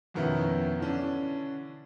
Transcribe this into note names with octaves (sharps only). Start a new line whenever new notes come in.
F2 B2 D#3 B3 C#4 E4
D3 E3 C#4 D4